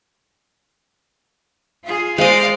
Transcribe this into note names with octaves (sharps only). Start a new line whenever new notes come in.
F4 G#4
G#3 C5 D5 D#5 F5